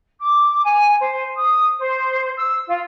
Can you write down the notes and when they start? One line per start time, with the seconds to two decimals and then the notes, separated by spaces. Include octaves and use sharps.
0.20 D6
0.63 G#5
0.99 C5
1.36 D#6
1.80 C5
2.36 E6
2.66 F4